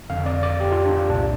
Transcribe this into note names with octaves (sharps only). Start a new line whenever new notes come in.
F2 D3 F5
D5
D5
G4
F4
D4
D4
C2 A#2 D4